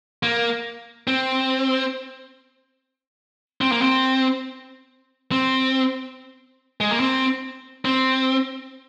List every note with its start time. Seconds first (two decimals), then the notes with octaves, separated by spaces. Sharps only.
0.23 A#3
1.08 C4
3.61 C4
3.72 A#3
3.82 C4
5.31 C4
6.81 G#3
6.91 A#3
7.00 C4
7.85 C4